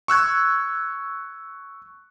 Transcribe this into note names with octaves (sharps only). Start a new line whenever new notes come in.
C#6 E6 F#6 G#6